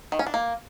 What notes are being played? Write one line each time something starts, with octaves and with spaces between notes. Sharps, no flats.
D#3
C#4
D4
A#3